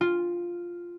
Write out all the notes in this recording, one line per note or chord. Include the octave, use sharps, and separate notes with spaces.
F4